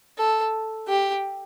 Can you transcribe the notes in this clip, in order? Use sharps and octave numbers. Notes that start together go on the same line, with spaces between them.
A4
G4